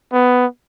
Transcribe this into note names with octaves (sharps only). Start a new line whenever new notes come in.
B3